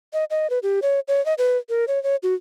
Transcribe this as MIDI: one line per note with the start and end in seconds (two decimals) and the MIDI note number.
0.13 0.24 75
0.30 0.50 75
0.50 0.59 71
0.63 0.80 67
0.82 1.00 73
1.08 1.24 73
1.26 1.34 75
1.38 1.57 71
1.69 1.85 70
1.88 2.01 73
2.03 2.16 73
2.23 2.34 66